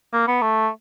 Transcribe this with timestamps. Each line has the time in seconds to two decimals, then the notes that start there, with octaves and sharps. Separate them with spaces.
0.13 A#3
0.28 B3
0.42 A3